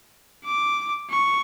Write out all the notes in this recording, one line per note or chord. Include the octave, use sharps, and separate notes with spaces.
D6
C#6